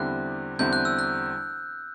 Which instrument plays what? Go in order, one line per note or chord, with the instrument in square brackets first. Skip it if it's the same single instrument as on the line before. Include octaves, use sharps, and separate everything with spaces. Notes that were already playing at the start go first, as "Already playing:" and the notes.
Already playing: [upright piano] E2 D3 G3 C4 E4 [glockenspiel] F#6
[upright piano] E2 D3 G3 C4 E4 [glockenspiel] G6
[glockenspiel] F#6
E6
F#6